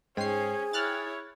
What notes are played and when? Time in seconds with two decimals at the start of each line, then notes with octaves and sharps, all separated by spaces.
0.17 G#2 C#4 G#4 C5 G5 C7
0.73 E4 C#5 F6 F#6 A6